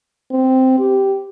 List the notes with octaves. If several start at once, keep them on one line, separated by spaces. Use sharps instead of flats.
C4
G4